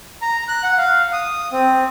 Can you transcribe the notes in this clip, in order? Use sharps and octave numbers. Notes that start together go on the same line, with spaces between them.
A#5
F#6
F#5
F5
D#6
C4